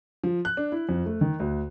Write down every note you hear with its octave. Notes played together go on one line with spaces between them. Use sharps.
F3
F#6
D4
E4
F2
A3
D#3
D2